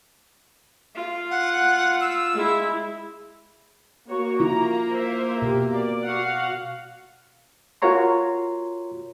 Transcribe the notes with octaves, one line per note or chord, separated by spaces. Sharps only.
F4
F#5
E6
G#3 E4
A#3 F#4 C#5
E4 F4 A#5
C5 E5
B2 G4
D5
F#4 F5 F#5
F4 F#4 A#4 C#5 A#5 C6